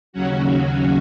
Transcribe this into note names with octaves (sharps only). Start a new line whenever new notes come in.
D#2 C#3 F#3 C#4 F#4